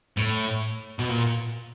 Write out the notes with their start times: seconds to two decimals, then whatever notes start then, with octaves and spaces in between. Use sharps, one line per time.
0.17 A2
0.99 B2
1.09 A#2